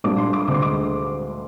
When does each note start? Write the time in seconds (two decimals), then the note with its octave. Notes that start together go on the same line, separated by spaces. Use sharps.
0.04 A#1 A#2 G3 D4 D6
0.18 C6
0.33 D6
0.48 D2 D3 G#3 D6
0.54 C6
0.62 D6